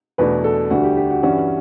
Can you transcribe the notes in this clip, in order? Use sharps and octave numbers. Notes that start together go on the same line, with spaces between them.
E2 B2 A3 D4 B4
A4
D2 D3 G3 F#4
G4
G4
F#4
G2 E3 G3 C#4 F#4